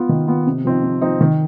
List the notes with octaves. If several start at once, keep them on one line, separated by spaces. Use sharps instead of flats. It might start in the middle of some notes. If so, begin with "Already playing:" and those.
Already playing: B3 F4
D#3
B3 F4
C3
F3 C4 D#4
C3
F3 C4 D#4
D#3